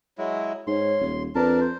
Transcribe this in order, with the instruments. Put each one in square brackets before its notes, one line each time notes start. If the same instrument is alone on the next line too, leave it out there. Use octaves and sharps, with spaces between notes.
[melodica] F#3 G#3 E4
[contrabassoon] G#2 [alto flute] C#5 [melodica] C6
[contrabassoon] D#1
[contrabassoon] F2 [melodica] D4 A#4 A5 [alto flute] B4
[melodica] C5